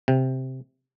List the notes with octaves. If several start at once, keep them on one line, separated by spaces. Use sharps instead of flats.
C3